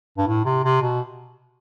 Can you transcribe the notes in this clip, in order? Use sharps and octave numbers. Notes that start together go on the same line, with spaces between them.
G2
A2
C3
C3
B2